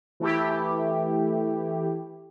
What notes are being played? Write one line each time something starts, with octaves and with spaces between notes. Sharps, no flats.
E3 A3 E4 G4